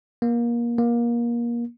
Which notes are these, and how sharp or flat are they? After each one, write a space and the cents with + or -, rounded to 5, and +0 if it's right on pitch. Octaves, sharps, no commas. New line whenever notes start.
A#3 +25
A#3 +25